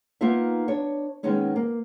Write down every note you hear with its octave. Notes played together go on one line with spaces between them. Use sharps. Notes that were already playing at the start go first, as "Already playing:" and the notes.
A#3 B3 D#4 F4 E5
D4 C#5
D#3 G#3 A#3 B3 C#4 D#4
A#3